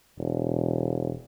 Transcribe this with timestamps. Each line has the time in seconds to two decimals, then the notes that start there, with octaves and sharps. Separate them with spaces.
0.18 E1